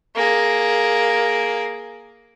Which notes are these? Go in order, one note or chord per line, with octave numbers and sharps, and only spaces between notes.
A#3 G#4